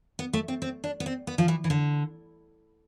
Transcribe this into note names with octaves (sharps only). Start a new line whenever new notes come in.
B3
A3
C4
C4
D4
B3
C4
B3
F3
E3
E3
D3